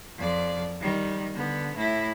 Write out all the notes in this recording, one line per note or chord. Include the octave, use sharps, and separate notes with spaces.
F2 D5
D#3 G3
D3 B3
A2 E4